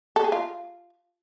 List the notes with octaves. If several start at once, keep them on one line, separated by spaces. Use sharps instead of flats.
A4
G#4
F4